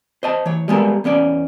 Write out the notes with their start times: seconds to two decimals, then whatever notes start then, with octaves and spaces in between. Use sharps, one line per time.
0.23 C5 D#5 A5
0.46 E3 C#5
0.68 G3 G#3 B3 A4 A#4
1.04 E2 B3 C#4 D5